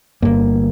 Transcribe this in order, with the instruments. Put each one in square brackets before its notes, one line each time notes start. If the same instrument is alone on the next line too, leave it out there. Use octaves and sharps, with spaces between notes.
[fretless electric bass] G1 G2 A#3